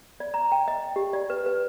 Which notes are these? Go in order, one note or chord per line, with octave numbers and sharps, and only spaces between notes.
D5
A#5
G5
D#5
G4
D5
B4
B4